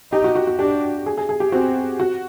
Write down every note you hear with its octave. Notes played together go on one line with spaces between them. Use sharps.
D#4 G4
F#4
F#4
F#4
D4 G4
G#4
G#4
G#4
G4
C4 F#4
F#4